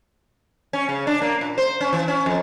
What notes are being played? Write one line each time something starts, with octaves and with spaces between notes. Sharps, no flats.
C#4
C#3
D4
A#3
A#2
C5
C#4
E3
C#4
F2